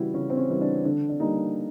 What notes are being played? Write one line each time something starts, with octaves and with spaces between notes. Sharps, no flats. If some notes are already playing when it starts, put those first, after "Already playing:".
Already playing: C#3 E3 G3 E4 F#4
C#3 C#4
C4
C#4
E3 G3
D4
D3 D4
D4
G3 A#3 D#4